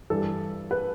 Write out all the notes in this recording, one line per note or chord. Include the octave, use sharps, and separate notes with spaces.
G2 E3 G3 A4
B4